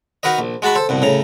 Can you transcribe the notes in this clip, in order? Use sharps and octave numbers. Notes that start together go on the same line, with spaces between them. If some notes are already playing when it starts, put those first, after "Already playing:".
D#4 F#4 A#4 B4 D#5
A#1
G#3 F#4 A5 B5 C#6
A4 C5
C2 G2 B2
A2 C#3 A#5